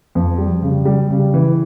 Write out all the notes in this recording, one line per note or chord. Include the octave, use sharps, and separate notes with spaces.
F2
G3
C#3
G3
C#3
E3